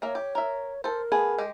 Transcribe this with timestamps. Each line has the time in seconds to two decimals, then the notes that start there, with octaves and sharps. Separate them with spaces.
0.02 A#3 A#4 C#5 E5
0.15 G4
0.35 A#4 E5
0.84 A4 A#4 C5
1.12 A3 B3 G#4
1.38 G#3 G4